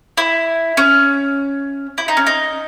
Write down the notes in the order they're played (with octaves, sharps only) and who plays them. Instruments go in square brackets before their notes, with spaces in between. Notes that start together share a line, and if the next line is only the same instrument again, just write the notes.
[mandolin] E4
C#4
E4
D#4
C#4
D#4